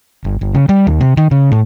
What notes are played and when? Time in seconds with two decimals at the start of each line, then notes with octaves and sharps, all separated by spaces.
0.24 G1
0.41 G1
0.55 C#3
0.69 G3
0.87 D#2
1.01 C3
1.17 D#3
1.31 C#3
1.51 A2